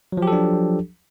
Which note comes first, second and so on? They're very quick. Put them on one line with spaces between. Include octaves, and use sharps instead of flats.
F#3 F3 G4 A4 D4